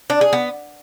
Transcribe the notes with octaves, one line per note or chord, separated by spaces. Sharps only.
D4
G#4
B3